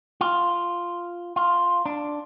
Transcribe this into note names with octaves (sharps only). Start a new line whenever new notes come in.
F4
F4
D4